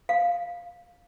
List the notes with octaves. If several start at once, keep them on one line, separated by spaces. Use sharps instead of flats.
F5